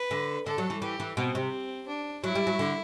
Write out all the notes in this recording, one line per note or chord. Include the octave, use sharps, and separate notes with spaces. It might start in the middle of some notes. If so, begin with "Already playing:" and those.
Already playing: B4
D3
D3 A4
F#3
E3
E3 G4
E3
B2 C4
C3
D4
F#3 E4
G3
F#3
D3